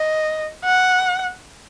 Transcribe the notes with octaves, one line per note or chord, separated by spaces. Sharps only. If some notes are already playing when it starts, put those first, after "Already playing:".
Already playing: D#5
F#5